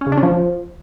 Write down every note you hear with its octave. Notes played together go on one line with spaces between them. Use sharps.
C#4
C#3
D4
C#4
F3